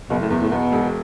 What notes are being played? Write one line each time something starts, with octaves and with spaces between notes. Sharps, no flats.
F#1 B2
A2
E2
A2
E2 B2
E1